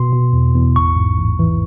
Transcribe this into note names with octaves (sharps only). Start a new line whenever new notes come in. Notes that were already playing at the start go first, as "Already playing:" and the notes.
Already playing: B2 C6
B2
E2
E2
A1 C#6
G#2
A1
E3